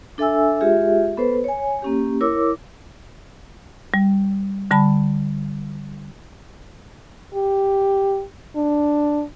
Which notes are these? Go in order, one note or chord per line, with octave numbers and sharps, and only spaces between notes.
D4 A4 E5 G#5 E6
G#3 F4 G4 G#4 E5
B3 A4 B4 C5
C#5 G#5
A#3 C#4 G4
E4 A#4 C#5 D6 E6
G3
D3 G3 A5 B5
G4
D4